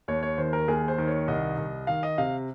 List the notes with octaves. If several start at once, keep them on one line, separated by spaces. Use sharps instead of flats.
D#2 C#5
C#5
D#3 C5
A#4
D#2 G#4
C5
D#3
C#5
C2 D#5
C2
D#3 F5
D#5
C3 F5